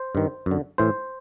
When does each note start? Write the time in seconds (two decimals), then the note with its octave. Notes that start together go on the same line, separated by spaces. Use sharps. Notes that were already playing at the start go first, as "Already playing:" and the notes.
Already playing: C5
0.15 G2 D#3
0.46 F#2
0.51 D3
0.78 A2 E3 C5